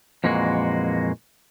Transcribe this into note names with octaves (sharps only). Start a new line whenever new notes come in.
F2 A#2 E3 G#3 A#3 F#4